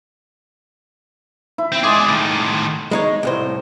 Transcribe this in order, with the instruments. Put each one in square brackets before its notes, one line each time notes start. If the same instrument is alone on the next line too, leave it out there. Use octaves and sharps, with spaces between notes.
[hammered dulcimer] E4
[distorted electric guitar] C4
[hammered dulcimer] G#3 D#5 D6 [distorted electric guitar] G#4 D5
[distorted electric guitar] A2 D#3
[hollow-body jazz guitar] G#3 D#4 C#5
C2 A2 C5